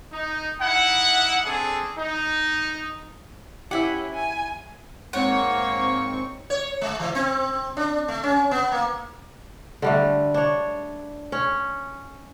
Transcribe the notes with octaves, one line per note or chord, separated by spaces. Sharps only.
D#4
D#4 E4 F#5
C4 D4 G#4 A4
D#4
C#4 E4 G4 E5 F#5
G#5
G#2 A#3 C4 C#5 F#5 C#6
C#5
G#3
E3
C4
D4
A3
C#4
B3
A#3
D3 G3 A3
D4 C#5
C#4